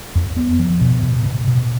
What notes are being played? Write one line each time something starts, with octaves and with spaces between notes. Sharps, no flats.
F2
B3
F3
B2
B2
B2
B2